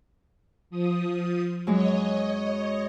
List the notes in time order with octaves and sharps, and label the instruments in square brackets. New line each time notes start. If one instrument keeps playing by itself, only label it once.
[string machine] F3 D#6
[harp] F#2 F#3 G#3 [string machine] C#5 D#5